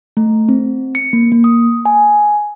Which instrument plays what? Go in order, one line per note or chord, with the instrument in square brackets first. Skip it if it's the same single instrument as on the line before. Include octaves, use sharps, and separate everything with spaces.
[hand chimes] A3
C4
C#7
A#3
A#3
D#6
G#5